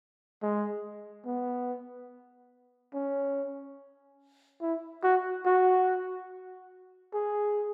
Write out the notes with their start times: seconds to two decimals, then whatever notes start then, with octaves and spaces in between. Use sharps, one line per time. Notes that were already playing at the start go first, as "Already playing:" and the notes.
0.42 G#3
1.26 B3
2.94 C#4
4.62 E4
5.04 F#4
5.46 F#4
7.14 G#4